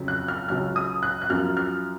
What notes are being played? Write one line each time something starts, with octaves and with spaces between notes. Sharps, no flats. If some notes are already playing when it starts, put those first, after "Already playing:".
Already playing: F2 C#3 F#3
F#6
F6
C#2 C#3 F#3 F6
D#6
F#6
F#6
F#2 F3 F6
F6